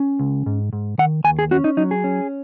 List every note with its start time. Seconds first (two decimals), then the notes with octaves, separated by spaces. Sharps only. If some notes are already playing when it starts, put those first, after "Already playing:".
Already playing: C#4
0.19 C#2
0.46 G#2
0.73 G#2
0.98 D#3 F#5
1.24 D#2 G#5
1.39 G#4
1.51 C#4 F#4
1.64 D#4
1.77 F#3 D#4
1.91 G#4
2.04 C#4